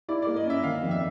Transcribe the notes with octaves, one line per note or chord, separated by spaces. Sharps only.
E4 D5
D5
A#3
D#5
C#4 E5
D#3 F5
F2
E5